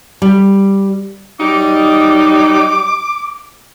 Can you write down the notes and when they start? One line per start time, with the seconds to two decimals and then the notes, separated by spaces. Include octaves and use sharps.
0.22 G3
1.40 F#3 G3 D#4 D6